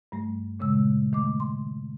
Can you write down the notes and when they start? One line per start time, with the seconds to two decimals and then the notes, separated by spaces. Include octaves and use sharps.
0.12 G2 G3 A3
0.60 A#2 C#3 G#3 E6
1.13 D#3 A3 D6
1.40 C6